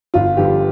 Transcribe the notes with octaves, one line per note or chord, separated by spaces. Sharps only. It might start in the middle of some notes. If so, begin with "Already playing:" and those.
G1 F4
G2 D3 F3 G4